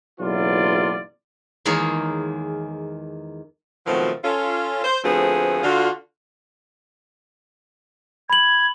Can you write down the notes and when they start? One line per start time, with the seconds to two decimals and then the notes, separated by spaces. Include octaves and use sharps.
0.20 F#1 B1 E3 F#3 F4 D5
1.65 E2 D#3 G#3 A#3 G#4 C#5
3.87 B2 D#3 F3 F#3 A3 C4
4.24 C#4 F4 A4
4.85 C5
5.04 D2 F3 A3 B3 C4 G#4
5.63 D3 F4 F#4
8.30 B5 G#6 F#7